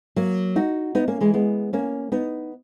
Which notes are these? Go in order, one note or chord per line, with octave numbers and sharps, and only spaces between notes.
F#3 A#3
D#4 F#4
B3 D#4
A#3 C#4
E3 G#3
G#3 B3
A#3 C#4
B3 D#4